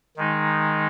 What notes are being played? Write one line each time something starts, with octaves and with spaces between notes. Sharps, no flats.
D#3 G#3 D#4